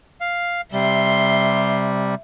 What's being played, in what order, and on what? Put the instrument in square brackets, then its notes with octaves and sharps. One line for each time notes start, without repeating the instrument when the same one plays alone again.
[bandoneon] F5
[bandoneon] C3 G3 [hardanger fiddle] E5 C6